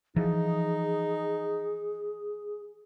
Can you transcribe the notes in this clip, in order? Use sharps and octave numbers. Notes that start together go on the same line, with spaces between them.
E3 F3 D#4 G#4